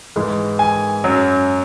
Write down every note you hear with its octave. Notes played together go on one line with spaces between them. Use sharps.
G#2 E3 G#3
G#5
F#2 F#3